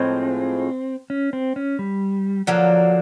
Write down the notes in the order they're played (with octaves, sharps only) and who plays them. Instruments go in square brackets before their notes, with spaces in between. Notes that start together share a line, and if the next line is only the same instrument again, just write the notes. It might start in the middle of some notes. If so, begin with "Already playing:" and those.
Already playing: [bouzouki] A2 F3 G#3 [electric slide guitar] C4
[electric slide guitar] C#4
C4
C#4
G3
[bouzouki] D3 F#3 A#3 [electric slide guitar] F3